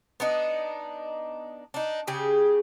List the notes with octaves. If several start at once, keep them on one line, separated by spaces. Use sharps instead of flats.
B3 D4 D#4
D4 D#4
C#3 G4 G#4